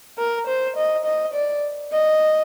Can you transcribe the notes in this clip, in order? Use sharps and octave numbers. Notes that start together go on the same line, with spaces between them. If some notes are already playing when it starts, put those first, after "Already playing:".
A#4
C5
D#5
D#5
D5
D#5